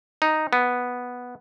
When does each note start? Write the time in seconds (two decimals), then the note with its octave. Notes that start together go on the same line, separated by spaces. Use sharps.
0.22 D#4
0.53 B3